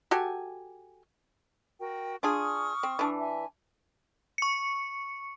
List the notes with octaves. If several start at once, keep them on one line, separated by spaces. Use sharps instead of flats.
F#4 G4 A4 G#5
F#4 A#4 G5
D4 F4 G#4 C#6 D#6 F6
C4
E3 D4
E5 G#5
C#6 C#7